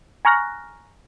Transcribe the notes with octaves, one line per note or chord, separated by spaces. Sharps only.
G#5 A#5 C#6 F6 F#6 A#6